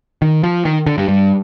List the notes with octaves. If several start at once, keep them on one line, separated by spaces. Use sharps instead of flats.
D#3
F3
D#3
D3
G2
G2